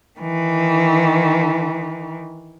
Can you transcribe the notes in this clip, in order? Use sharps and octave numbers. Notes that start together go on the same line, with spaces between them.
D#3 E3